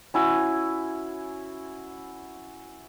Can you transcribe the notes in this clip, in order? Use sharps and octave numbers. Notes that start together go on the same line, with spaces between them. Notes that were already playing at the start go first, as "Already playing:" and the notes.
C#4 E4 F#4 G#5